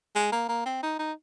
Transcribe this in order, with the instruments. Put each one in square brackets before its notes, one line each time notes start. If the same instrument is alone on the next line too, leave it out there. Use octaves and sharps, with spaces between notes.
[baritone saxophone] G#3
A#3
A#3
C4
D#4
D#4